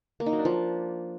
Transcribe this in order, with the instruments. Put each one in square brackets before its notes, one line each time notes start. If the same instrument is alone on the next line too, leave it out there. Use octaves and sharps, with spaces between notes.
[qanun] A#3
D#4
F#3
D4
F3